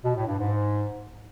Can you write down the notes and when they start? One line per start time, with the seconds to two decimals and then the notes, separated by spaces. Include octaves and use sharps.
0.04 B2
0.16 A2
0.27 G2
0.38 G#2